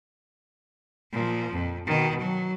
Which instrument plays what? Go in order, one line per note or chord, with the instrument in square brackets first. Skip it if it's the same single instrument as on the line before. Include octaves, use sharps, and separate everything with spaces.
[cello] A#2 F3
F2
B2 D#3
F#3